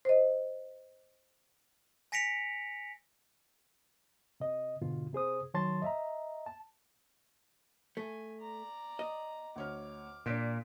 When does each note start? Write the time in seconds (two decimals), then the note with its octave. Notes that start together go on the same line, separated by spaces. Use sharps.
0.05 C5 D#5
2.12 G#5 A#6 B6 C#7 D7 F7
4.40 C3 D#5
4.82 G#2 B2 D3 F4
5.13 C3 G#4 C5 D#6
5.54 D#3 F#3 C#5 A5 C6 A6
5.82 D#5 E5 A#5
6.46 A5
7.97 A3 G#5
8.40 D5 A#5
8.99 D#5
9.56 D2 C#5 D6 F6
10.26 A#2 D4 B6 D7